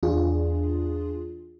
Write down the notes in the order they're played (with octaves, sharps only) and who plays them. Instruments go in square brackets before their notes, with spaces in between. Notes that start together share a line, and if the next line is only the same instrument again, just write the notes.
[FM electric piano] E2 D4 F4 G#4